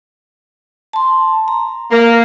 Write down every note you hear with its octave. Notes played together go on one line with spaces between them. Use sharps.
A5 C6
A#5
A#3